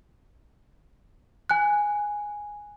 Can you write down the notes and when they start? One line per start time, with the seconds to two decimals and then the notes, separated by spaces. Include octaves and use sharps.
1.50 G#5 F#6